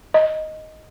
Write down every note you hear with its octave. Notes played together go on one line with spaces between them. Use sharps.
D#5